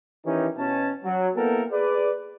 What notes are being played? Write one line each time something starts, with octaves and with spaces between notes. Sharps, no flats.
D#3 E3 C#4 D#4 G4
B2 C#4 A5
F#3
A#3 B3 E4 A4 A#4 G5
G#4 B4 D5